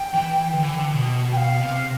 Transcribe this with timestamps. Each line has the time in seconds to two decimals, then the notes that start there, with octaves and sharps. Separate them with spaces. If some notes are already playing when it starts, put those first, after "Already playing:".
Already playing: G5
0.14 E3
0.53 D3
0.63 E3
0.74 D3
0.92 B2
1.32 B2 G5
1.37 F5
1.59 C3